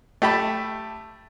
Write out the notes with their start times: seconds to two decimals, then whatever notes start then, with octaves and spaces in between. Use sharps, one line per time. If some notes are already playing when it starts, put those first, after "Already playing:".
0.22 A3 G4 A5 B5